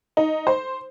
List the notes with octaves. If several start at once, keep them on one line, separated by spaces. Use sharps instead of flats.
D#4
C5